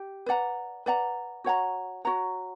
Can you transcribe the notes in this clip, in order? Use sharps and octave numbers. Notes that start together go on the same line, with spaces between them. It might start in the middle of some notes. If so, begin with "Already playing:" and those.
Already playing: G4
B4 D5 F#5 A#5
B4 D5 F#5 A#5
F#4 C#5 F#5 A#5
F#4 C#5 F#5 A#5